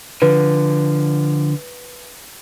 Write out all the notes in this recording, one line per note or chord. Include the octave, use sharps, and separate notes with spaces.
D3 F3 B4